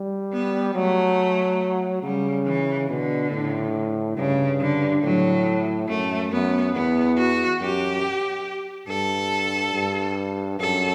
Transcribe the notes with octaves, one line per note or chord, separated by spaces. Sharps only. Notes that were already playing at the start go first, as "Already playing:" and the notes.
Already playing: G3
B3
F#3 A3
C#3 G3
E3
B2 D3
A2
G2 C#3
D3
A2 F#3
F#2 A3
F#2 B3
E2 B3
F#4
F#2 G4
G2 A4
G2
F#2 A4